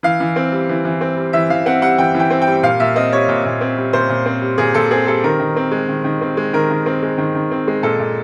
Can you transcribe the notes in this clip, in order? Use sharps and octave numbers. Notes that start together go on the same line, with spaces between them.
E3 F5
E3
C4
G3
E3
E3
C4
G3
E3 E5
E3 F5
C4 F#5
G3 F#5
E3 G5
E3 G5
C4
G5
G3
A#2 F5
A#2 E5
C4 D#5
G3 C#5
A#2
A#2
C4
G3
A#2 C5
A#2
C4
G3
A#2 G#4
A#2 A4
C4 G#4
G3 A4
D#3 A#4
D#3
C4
G#3
D#3
D#3
C4
G#3
D#3 A#4
D#3
C4
G#3
D#3
D#3
C4
G#3
A#2 A4
A#2